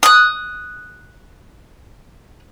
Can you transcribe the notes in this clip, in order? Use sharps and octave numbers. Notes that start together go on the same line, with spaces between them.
D#6 F#6